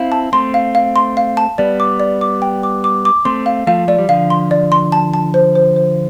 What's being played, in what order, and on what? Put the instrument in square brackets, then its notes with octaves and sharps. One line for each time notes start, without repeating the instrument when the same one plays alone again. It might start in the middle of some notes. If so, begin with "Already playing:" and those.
Already playing: [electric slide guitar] C4 E4 [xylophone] F5
[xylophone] A5
[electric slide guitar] A3 C4 [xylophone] C6
[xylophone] F5
F5
C6
F5
A5
[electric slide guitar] G3 B3 [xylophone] D5
[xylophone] D6
D5
D6
G5
D6
D6
D6
[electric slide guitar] A3 C4 [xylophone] C6
[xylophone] F5
[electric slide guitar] F3 A3 [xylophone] F5
[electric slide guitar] A3 [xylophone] D5
[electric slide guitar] G3
[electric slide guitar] D3 F3 [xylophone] F5
[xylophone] C6
D5
C6
A5
A5
C5
C5
C5